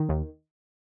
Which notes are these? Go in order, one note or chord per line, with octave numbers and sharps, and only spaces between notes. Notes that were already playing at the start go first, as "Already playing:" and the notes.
Already playing: D#3
D#2